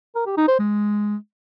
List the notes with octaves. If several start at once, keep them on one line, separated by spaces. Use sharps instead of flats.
A#4
G4
D#4
C5
G#3